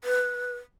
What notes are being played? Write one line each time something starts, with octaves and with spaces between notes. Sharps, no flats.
B4